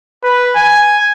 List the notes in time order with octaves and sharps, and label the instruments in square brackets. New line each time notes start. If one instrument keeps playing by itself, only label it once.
[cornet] B4
G#5